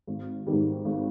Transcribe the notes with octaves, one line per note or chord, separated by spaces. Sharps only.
G#1
G#2 D#3 G3
G#1